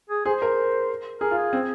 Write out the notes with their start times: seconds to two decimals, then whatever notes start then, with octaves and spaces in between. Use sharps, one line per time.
0.10 G#4
0.26 G#4 C5
0.42 A#4
1.21 G#4 A#4
1.31 F4
1.37 G#4
1.53 C4